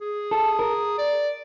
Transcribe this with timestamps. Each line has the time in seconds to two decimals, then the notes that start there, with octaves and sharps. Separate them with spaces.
0.01 G#4
0.31 A4
0.59 A#4
0.98 D5